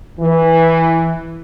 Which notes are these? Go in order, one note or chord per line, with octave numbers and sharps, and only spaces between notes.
E3